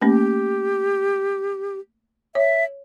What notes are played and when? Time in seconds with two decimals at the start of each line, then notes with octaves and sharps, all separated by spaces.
0.02 A3 A#3 C#4 G4
2.35 C#5 E5